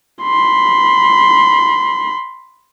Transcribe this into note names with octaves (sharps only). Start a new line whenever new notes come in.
B5 C6